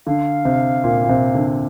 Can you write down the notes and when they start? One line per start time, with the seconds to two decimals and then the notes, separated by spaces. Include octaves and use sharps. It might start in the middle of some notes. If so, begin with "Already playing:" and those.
0.07 D3 F5
0.45 C3
0.84 A#2
1.04 A#2
1.09 C3
1.35 D3